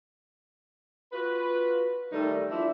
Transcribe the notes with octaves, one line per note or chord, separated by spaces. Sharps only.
F4 F#4 B4
D#3 G3 A3 D#4 A4
F3 D4 E4 E5